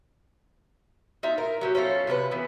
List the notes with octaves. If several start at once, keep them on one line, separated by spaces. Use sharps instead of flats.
D#4 F4 E5 A#5
A#4
F#3 C#4 G4
C#4 E4 F4 A4
C3 C#4 E4 B4
E3 B3